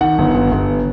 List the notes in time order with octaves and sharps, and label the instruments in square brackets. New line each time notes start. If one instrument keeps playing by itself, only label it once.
[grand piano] D#3 F#5
G1
G1
G1